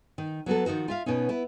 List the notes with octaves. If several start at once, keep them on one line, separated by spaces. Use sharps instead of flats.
D#3
F#3 B3 F#4 A4
D#3 F3 D#4 F#4
F4 E5 F5
B2 B3 C#4 D#4
B3 E4